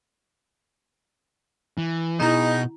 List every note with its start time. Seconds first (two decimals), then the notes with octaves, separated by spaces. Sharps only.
1.78 E3
2.20 B2 D#4 E4 G#4 A#5